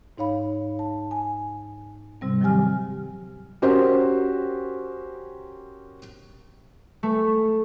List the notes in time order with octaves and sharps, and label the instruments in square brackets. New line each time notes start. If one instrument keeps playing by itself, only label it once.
[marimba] G#2 D#4 C#5 F5 B5
A5
G#5
G#2 C3 G3 C4
D#3 F3 F#3 G4 G#5 F6
[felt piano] C#4 F#4 G4 A#4 C5
[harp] A3